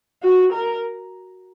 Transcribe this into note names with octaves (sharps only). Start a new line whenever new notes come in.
F#4
A#4